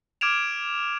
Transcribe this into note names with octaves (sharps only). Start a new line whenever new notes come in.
D6 F6 G#6 D7 E7 F7